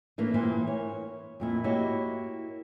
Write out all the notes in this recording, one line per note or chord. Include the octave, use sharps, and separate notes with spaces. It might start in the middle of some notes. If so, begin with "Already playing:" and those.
A2 E3 A#3 D4
G2 A#2 E3 A#3 E4 C5
C#5
F2 A#2 E4
A#3 E4 F#4 G4 C#5 D#5